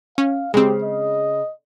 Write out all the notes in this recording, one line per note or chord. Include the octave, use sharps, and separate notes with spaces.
C#4 F5
C#3 G#3 C4 G4
D#5